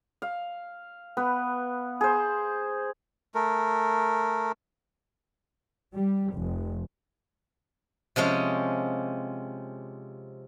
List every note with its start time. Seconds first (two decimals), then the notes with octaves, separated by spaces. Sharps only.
0.22 F5
1.17 B3 B4
2.01 G#4 C5
3.35 A3 A#4
5.93 G3
6.33 F1
8.16 C3 F3 G#3 C#4